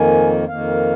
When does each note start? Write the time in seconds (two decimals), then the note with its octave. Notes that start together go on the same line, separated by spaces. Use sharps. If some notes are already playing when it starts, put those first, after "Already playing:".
Already playing: F2 D#3 A#3 G#5
0.48 F2 D#3 A#3 F5